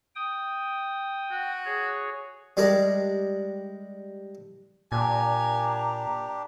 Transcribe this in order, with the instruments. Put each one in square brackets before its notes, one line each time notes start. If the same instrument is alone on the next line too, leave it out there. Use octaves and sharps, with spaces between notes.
[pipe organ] G5 D#6
[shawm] F#4
[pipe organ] G#4 C#5
[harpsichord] G3 G#3 D4 G4 G#4 A#4
[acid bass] A#2 [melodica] D4 G4 [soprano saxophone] G#5 [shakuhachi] A#5